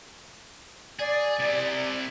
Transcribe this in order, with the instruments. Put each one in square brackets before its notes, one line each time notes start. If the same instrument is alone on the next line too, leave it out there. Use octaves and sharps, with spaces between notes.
[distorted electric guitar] G#4 [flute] D5
[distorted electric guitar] C3 E4